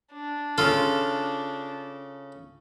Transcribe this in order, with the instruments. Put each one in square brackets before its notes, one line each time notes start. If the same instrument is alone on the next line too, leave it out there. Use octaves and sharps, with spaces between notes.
[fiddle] D4
[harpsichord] C#3 A4 [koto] F4